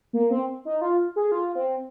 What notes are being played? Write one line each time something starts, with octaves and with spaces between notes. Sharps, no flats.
A#3
C4
D#4
F4
G#4
F4
C4